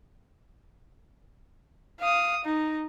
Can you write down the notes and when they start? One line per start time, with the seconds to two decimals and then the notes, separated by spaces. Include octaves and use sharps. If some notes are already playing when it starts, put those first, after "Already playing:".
2.00 F5 D#6
2.45 D#4